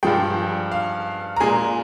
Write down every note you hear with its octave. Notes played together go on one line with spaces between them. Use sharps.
G2 F3 G#3 G5
F5
A#5
A#2 G#3 G#5